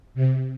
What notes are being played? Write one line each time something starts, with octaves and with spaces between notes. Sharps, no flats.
C3